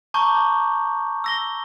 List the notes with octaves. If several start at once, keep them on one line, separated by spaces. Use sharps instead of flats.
A5 A#5 C#6 D6 G6
E6 A#6 G7